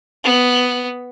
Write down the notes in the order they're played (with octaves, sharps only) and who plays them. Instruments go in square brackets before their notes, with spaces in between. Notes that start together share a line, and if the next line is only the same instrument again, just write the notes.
[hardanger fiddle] B3